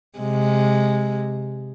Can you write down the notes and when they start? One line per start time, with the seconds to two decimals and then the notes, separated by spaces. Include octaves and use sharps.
0.19 C3 G#3